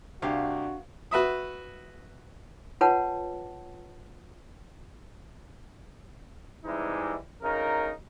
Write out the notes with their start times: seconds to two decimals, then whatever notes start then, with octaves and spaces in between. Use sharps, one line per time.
0.22 C2 D4 F#4 G4 F5
1.11 F#4 B4 E5 D#6
2.81 F4 B4 C#5 F#5 A5
6.65 C3 E3 G3 G#3 D#4 E4
7.42 D2 C#3 D#4 A#4